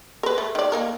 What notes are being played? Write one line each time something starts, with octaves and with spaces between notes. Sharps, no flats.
A#4 B4
A3
D#3 D5
A#3 D#4 A#4